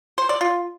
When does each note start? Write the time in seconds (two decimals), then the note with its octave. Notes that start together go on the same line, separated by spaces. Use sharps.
0.18 C5
0.29 D5
0.41 F4